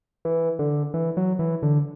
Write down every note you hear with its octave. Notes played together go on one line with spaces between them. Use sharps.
E3
D3
E3
F#3
E3
D3